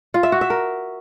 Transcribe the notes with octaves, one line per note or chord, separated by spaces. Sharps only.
F4
E5
F#4
E5
A#4